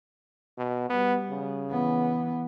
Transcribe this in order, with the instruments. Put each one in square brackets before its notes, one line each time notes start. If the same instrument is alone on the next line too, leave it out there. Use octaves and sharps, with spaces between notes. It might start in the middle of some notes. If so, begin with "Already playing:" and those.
[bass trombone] B2
[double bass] G3 [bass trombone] B3
[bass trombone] C#3
[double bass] E3 B3